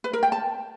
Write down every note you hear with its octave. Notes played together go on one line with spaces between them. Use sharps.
B4
A#4
G5
A5